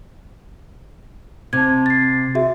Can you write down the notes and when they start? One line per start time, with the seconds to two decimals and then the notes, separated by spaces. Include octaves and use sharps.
1.53 C3 A5 G#6
1.86 A6 C7
2.35 F#4 G#4 E5